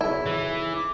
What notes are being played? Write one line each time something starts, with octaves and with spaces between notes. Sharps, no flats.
B1 C#3 E4 C#5
E3
D6